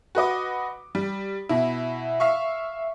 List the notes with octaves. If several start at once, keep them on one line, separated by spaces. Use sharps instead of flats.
F#4 B4 D#5 D6
G3
B2 E4
E5 F5 C#6